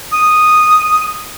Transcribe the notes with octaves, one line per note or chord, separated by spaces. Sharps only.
D#6